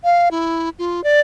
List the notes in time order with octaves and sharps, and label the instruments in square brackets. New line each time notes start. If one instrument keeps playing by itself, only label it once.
[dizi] F5
E4
F4
D5